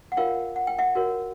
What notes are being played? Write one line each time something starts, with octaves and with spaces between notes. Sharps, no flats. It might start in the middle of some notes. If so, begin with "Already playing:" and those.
F#5
F4 A#4 C#5 F5 G5
F#5
G5
E5 F#5
F#4 A#4 C#5